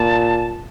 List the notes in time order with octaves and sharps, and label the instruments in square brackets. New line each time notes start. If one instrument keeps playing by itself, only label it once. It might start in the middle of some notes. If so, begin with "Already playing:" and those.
Already playing: [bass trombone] A#2 [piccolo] A5